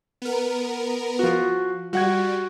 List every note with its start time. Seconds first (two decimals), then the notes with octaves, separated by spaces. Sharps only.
0.22 B3 A#4
1.19 F3 F#4
1.93 G3 F#4 F#5 G#6